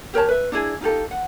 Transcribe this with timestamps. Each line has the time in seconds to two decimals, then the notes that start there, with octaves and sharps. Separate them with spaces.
0.14 G4 A#4 C#5 A5
0.28 B4 E5
0.52 D4 E4 G#4
0.81 D#4 F4 G4 A4
1.11 F#5